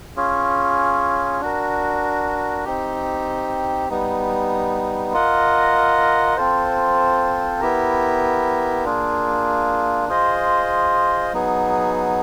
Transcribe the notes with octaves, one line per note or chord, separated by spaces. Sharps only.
C#4 F4 G#4 C#5
D4 F#4 A#4
C4 D#4 G4
G3 B3 D#4
F4 A#4 D#5 F#5
C4 F4 A4 C5
B3 E4 G4 A#4
A#3 D4 F4 G#4
F4 G#4 C5 D#5
F#3 B3 D#4 G#4